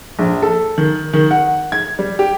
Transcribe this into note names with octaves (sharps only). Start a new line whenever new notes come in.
A#1
A4
D#3
D#3
F#5
G#6
G3
G4